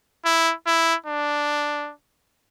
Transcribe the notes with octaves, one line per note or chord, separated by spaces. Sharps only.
E4
E4
D4